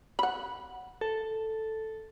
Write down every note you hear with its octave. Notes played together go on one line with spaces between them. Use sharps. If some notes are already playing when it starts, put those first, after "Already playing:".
F#5 B5
A4